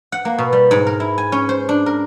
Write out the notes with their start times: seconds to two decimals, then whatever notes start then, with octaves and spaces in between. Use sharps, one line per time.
0.12 F#5
0.25 A#3
0.38 B2
0.52 G3
0.71 G#2
0.87 A#4
1.00 E4
1.18 G#5
1.32 C#4
1.49 C5
1.69 D4
1.86 A#4